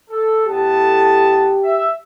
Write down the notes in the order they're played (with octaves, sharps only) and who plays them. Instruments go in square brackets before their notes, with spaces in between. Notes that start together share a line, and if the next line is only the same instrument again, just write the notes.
[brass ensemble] A4
[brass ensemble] A2 B3 A5 [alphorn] G4
[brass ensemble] E5